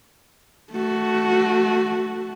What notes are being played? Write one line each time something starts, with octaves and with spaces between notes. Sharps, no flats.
A3 F#4